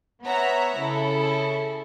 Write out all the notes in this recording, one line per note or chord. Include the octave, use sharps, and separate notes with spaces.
B3 C#5 E5 F#5 A#5
C#3 E4 A4